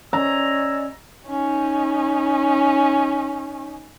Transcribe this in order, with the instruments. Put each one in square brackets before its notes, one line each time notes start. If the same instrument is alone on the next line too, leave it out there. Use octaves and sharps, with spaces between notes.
[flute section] C#4 D5 D#5 [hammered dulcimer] A#5 [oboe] E6
[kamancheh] C#4 D#4